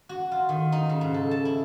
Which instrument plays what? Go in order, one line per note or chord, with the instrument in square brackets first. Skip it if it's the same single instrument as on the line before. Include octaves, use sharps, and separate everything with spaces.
[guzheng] F#4
F4
D#3
D#4
C#3
G#2
A4
A5
E4